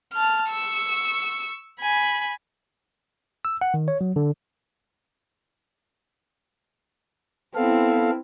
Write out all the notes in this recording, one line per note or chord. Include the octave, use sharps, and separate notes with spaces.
A5 F6
C#6 E6
G#5 B5
E6
F#5
D#3
C#5
F#3
D3
B3 C4 E4 A4 F5